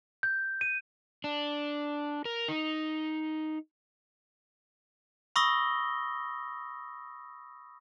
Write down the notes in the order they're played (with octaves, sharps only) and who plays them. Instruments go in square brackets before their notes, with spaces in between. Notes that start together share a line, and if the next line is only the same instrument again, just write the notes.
[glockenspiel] G6
D#7
[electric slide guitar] D4
A#4
D#4
[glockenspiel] B5 C#6 D#6 E6 A#6 G7